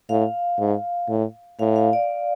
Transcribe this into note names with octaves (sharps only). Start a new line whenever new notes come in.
A2 F5
G#2
A2
A2 F5
F5
D5